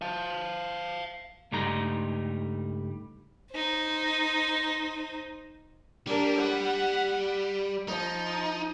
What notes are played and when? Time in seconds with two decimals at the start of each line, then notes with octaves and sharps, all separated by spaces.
0.02 F5 A5
1.52 C#2 G2 G3 A3 D#4 A#5
3.54 D#4 C5
6.07 G3 D4 A#4
6.38 F#5
7.88 F3 D#4